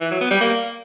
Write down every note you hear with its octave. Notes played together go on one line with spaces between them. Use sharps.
E3
F#3
B3
G3
A#3